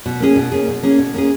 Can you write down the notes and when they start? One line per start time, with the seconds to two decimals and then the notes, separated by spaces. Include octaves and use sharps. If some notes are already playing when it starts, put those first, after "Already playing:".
0.06 B2
0.20 A#3 C#4 G#4
0.36 B2
0.52 A#3 C#4 G#4
0.68 B2
0.83 A#3 C#4 G#4
0.99 B2
1.14 A#3 C#4 G#4